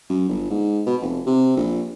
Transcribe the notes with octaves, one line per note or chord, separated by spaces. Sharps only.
F#2
G1
G#2
B2
F1
C3
A#1